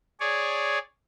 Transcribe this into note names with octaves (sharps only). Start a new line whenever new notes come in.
G#4 C#5 D5